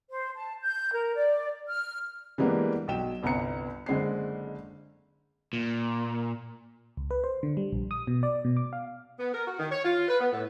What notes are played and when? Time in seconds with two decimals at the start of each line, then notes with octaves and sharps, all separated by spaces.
0.10 C5
0.36 A5
0.62 G6
0.93 A#4
1.15 D5
1.69 F6
2.38 E3 G3 G#3 A#3 B3 D4
2.88 B1 F#3 G5 E7
3.23 G1 C2 B3 A#5 C#7
3.86 F#1 D3 G#3 C4 C7
5.53 A#2
6.97 C#2
7.11 B4
7.24 C5
7.43 D3
7.57 G3
7.72 A#1
7.91 D#6
8.07 B2
8.23 D5
8.45 B2
8.57 D6
8.73 F5
9.19 B3
9.33 A#4
9.46 F#4
9.59 D#3
9.71 C#5
9.84 F4
10.08 B4
10.20 B3
10.32 A2